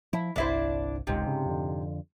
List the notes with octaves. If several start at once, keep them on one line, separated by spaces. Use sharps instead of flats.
F3 E4
G1 C2 D4 E4 C5
G1 C#2 G#2 C3
C#3
F2 D3